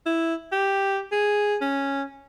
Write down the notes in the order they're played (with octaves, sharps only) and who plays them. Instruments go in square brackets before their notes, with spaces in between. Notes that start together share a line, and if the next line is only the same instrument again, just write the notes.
[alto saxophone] E4
G4
G#4
C#4